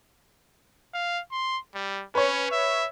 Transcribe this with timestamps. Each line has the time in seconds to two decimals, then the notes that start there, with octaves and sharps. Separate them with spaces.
0.94 F5
1.31 C6
1.75 G3
2.15 C#4 B4 C#5
2.51 E5